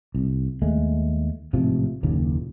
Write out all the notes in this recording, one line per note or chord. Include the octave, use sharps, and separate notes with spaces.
C2
D#2 G#3 A3
A1 G#2 C3 F3
F#1 D#2 A#2 C#3